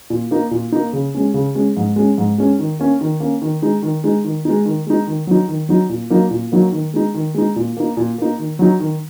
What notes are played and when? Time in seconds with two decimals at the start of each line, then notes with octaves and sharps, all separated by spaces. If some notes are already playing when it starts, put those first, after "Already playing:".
0.10 A#2
0.31 A#3 D#4
0.51 A#2
0.72 A#3 D#4
0.93 C#3
1.14 G#3 C#4
1.34 C#3
1.55 G#3 C#4
1.77 G#2
1.96 G#3 C#4
2.18 G#2
2.38 G#3 C#4
2.59 D#3
2.80 A#3 C#4
3.01 D#3
3.20 A#3 C#4
3.42 D#3
3.62 G#3 D#4
3.82 D#3
4.04 G#3 D#4
4.24 D#3
4.45 G#3 D#4
4.65 D#3
4.87 G#3 D#4
5.07 D#3
5.27 F#3 D#4
5.48 D#3
5.69 F#3 D#4
5.89 A#2
6.10 F#3 A#3 D#4
6.31 A#2
6.52 F#3 A#3 D#4
6.72 D#3
6.94 G#3 D#4
7.14 D#3
7.34 G#3 D#4
7.56 A#2
7.77 A#3 D#4
7.97 A#2
8.18 A#3 D#4
8.38 D#3
8.59 F#3 D#4
8.80 D#3